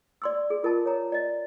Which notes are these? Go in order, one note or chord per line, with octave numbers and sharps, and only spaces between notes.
D5 C6 E6
G#4
F4 A#4 D#5 A5
C#5 A#5
D5 D#5